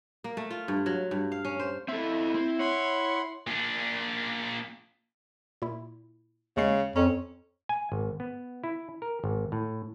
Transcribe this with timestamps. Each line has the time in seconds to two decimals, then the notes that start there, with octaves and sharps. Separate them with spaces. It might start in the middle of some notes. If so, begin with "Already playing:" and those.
0.24 A#3
0.37 A3
0.51 F4
0.68 G2
0.86 F#3
1.11 G2
1.32 F5
1.45 C#4
1.60 C5
1.88 C4 E4 A4
2.35 C4
2.59 C#5 F#5 B5 C6
3.47 A#2 D4
5.62 A#2 E4
6.57 D#2 C#3 G#3 C7
6.96 F2 C#4 A#5
7.69 G#5
7.92 G#1
8.20 B3
8.64 E4
9.02 A#4
9.24 G#1
9.52 A2